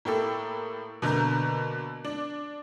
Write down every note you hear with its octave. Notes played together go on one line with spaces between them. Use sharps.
A2 A#3 G4 A4 E6
B2 D3 A#3 A#5 G6
D4